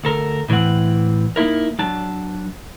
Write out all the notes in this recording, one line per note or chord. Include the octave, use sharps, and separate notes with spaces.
D2 A4 A#4
A2 E3 G#3 C4 F#5
A#3 D#4 E4 A#4
F#3 D4 A5